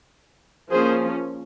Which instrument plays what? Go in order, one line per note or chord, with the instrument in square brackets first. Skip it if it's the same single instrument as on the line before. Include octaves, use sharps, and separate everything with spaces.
[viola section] F3 A#3 C#4 G#4 C5